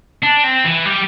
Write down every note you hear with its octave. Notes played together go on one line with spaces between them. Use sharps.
D4
C4
E3
G3